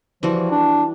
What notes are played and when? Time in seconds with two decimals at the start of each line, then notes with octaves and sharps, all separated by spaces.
0.23 E3 F3 G3 F#4
0.51 D4